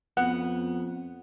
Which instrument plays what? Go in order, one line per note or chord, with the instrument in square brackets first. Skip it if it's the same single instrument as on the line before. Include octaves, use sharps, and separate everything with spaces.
[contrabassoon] F2 [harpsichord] B3 [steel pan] F#5